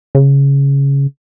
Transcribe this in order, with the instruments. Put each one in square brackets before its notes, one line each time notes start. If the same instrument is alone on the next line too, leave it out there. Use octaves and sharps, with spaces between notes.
[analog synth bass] C#3